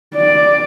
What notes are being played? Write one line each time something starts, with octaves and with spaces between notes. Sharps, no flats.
D5